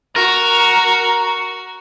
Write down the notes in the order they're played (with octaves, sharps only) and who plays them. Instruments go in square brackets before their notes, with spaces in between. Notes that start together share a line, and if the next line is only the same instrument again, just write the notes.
[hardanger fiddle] F#4 [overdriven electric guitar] A#4